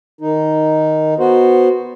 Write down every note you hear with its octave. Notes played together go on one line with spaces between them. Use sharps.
D#3 D#4
B3 F#4 C5